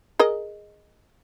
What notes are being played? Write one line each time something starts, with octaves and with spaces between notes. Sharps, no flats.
G#4 A#4 D#5